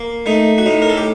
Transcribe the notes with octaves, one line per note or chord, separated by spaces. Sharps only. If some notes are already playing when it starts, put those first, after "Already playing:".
Already playing: A#3
A3 D#4
F#4
A2 D#4
A#4
A4
G4